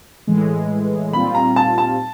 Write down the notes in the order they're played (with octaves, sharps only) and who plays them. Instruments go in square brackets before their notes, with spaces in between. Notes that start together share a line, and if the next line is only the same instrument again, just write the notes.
[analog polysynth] A2 E3 G#3
[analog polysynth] A#2 G3 C4 F4 [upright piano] B5
[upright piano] A#5
A5
A5